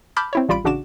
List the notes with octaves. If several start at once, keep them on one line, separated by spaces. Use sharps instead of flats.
A5 B5 D6 F6 G6
C4 E4 C#5
A1 G3 F4 D5 B5 D7
A1 C#3 D4 F#4 D6 E7